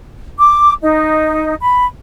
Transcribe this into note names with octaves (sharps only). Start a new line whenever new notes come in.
D6
D#4
B5